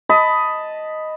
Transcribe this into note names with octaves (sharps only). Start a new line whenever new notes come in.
D#5 A5 B5